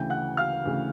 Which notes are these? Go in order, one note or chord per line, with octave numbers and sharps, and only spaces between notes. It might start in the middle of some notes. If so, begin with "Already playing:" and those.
Already playing: D2 C#3 E3 G5 G6
F#5 F#6
F5 F6
D2 C#3 E3